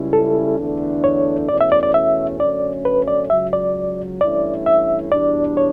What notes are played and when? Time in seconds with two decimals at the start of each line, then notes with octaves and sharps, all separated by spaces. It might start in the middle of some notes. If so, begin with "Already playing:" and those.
Already playing: C#2 C#3 G3 C#4 E4
0.13 A4
0.58 E2 D3 A3 D4
1.04 C#5
1.49 E2 B2 A3 C#4 D5
1.61 E5
1.72 D5
1.83 D5
1.94 E5
2.39 F#2 D3 A3 C#4 D5
2.85 B4
3.08 D5
3.30 C#2 C#3 F#3 E5
3.53 D5
4.21 G2 E3 A3 C#4 E4 D5
4.66 E5
5.12 E2 B2 G3 D4 D5
5.57 C#5